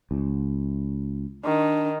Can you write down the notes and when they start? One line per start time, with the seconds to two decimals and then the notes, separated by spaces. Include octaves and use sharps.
0.11 C#2
1.45 D#3 D4